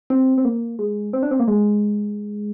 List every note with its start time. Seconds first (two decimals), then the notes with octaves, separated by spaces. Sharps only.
0.10 C4
0.38 C4
0.45 A#3
0.79 G#3
1.13 C4
1.23 D4
1.31 C4
1.40 A#3
1.48 G#3